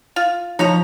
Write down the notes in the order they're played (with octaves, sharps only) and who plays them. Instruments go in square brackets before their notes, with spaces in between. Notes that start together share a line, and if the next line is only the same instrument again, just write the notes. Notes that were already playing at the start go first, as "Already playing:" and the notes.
[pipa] F4
[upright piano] F3 [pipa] D#4 C#5 A#5